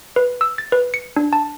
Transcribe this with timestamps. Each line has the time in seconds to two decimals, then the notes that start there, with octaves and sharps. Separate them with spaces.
0.16 B4
0.41 E6
0.58 A6
0.72 B4
0.94 C#7
1.16 D4
1.33 A5